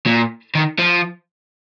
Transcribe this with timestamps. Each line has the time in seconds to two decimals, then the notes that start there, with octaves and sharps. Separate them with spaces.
0.07 A#2
0.55 D#3
0.79 F3